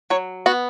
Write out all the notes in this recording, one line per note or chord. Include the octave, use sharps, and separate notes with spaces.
F#3 C#5
B3 F#4